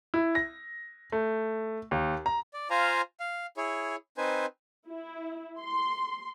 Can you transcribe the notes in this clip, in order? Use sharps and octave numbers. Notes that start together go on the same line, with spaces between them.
E4
A#6
A3
D#2
A#5
D5
F4 C5 F5 G#5 A#5
F5
E4 G#4 C#5
C4 D#4 B4 C5 G#5
E4
C6